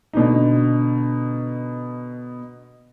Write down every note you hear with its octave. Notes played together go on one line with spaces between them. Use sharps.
B2 D3 D#4